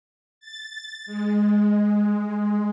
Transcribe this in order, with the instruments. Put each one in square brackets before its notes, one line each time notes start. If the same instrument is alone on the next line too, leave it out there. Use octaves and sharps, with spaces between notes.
[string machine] A6
G#3